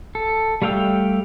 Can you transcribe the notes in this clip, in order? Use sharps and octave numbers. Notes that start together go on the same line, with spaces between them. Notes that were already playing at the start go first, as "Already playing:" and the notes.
A4
G3 A3 F5 G5 E6